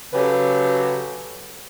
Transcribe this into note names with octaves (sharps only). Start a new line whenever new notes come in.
C#3 F#3 G4 A4 B4